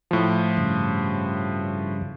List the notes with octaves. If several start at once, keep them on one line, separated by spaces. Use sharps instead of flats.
A2 F3
G2 C#3